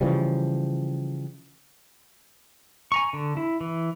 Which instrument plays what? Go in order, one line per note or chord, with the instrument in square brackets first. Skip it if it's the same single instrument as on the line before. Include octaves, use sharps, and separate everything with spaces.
[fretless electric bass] C#3 E3 F3 G3
[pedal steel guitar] G#5 A#5 C#6
D3
E4
E3